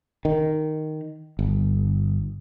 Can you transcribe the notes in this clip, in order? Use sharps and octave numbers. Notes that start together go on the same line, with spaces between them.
D#3
G1